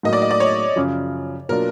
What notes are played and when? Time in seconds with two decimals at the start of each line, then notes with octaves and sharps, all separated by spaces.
0.03 A2 F#3 A#3 D#4 D#5
0.13 D5
0.22 D#5
0.31 D5
0.40 C#5
0.76 F#2 C#3 F3
1.49 B2 F#3 A#3 D4 F4 A#4